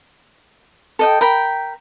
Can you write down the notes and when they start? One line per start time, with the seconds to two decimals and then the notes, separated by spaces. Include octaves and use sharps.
0.99 A4 D#5 G5
1.21 A#4 G5 B5